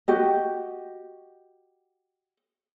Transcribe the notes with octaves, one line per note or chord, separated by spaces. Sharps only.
F#4 G4 D#5